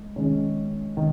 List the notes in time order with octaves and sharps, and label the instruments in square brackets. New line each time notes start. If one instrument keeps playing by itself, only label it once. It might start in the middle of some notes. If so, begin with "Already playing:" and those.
Already playing: [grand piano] G#3
D#3 G#3 C#4
D#3